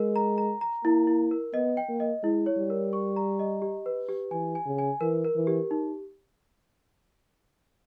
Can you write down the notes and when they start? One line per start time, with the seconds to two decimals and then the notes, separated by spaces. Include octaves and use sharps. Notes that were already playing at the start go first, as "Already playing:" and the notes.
Already playing: G#3 A#4
0.16 A#5
0.38 A#5
0.61 A#5
0.84 A#3 E4
1.07 E4
1.31 A#4
1.54 B3 D#5
1.77 G5
1.89 A#3
2.00 D#5
2.23 G#3 E4
2.46 C#5
2.58 G3
2.70 A#4
2.93 C#6
3.16 A#5
3.39 D#5
3.62 G4
3.86 B4
4.09 G4
4.31 E3 G#5
4.55 G#5
4.66 C#3
4.78 G#5
5.01 E3 A#4
5.24 A#4
5.35 E3
5.47 G4
5.71 D#4